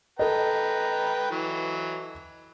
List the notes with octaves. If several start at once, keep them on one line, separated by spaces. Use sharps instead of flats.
A4 B4 D#5 G5 A#5
E3 F#3